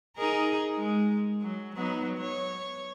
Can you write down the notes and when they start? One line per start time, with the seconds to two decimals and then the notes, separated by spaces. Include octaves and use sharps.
0.17 D#4 G#4 A#4
0.75 G#3
1.41 F#3
1.75 F#3 B3 D#4
2.18 C#5